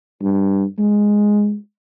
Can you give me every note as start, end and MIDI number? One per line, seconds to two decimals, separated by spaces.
0.22 0.64 43
0.79 1.56 56